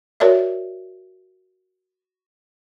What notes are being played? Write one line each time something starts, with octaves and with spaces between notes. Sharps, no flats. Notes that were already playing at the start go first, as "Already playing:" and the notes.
F#4 A#4 C#5 D5 E5